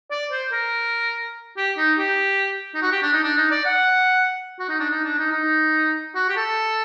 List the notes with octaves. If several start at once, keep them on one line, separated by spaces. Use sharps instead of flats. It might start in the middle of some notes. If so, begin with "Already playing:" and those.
D5
C5
A#4
G4
D#4
G4
D#4
F#4
G4
D4
D#4
D4
D#4
D5
F#5
F#4
D#4
D4
D#4
D4
D#4
D#4
F#4
G4
A4